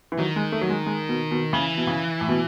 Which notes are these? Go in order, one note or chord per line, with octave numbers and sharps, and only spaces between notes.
E3
D#3 F#3
G#3
A3
F#3
G#3
G#3
B2
B2
C#3 E3
B2
C#3
A2
B2